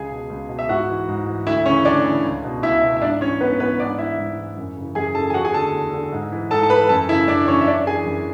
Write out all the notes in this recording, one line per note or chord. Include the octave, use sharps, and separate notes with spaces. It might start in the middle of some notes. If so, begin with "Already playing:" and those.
Already playing: C#2 G#4 G#5
B2
C#2
B2
E5
G#2 F#4 F#5
E3
G#2
E3
D2 E4 E5
C#3 E3 C#4 C#5
D2 D4 D5
C#3 E3
C#2
B2
C#2 E4 E5
B2
E5
G#2 D4 D5
E3 C#4 C#5
G#2 B3 B4
E3 B3 B4
G#2 D4 D5
E3 E4 E5
G#2
E3
F#2
C#3 E3
F#2 G#4 G#5
C#3 E3 A4 A5
G#5
E2 F#4 F#5
G#4 G#5
D3 A4 A5
E2
D3
G#2
E3
G#2 A4 A5
A5
E3 B4 B5
F#2 A4 A5
C#3 E3 E4 E5
F#2 D4 D5
C#3 E3 C#4 C#5
E5
F#2 D4 D5
E3 G#4 G#5
F#2